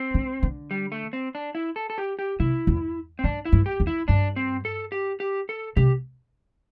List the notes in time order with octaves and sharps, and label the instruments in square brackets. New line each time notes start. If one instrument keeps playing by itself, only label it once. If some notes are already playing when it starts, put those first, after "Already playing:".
Already playing: [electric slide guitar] C4
[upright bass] D3
D3
[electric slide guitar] G3
A3
C4
D4
E4
A4
A4
G4
G4
[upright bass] C3 [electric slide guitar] E4
[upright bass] E2
[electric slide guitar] C4
[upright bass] G2 [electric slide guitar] D4
[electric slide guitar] E4
[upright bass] G2
[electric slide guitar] G4
[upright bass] E2
[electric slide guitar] E4
[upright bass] G2 [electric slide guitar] D4
[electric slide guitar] C4
A4
G4
G4
A4
[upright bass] C3 [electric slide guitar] G4